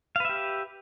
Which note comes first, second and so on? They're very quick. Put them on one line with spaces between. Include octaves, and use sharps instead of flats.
F5 B4 E5 G4